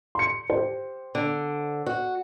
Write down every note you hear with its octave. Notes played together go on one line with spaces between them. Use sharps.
C6 C#7
G4 C5
D3
F#4